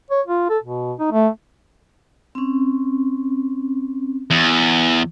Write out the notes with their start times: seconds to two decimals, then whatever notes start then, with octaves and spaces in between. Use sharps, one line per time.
0.11 C#5
0.27 F4
0.50 A4
0.63 B2
1.00 D#4
1.12 A3
2.35 C4 C#4
4.30 E2